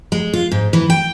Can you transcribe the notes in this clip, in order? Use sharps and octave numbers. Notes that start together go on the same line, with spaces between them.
G#3
F4
G#2
E3
G5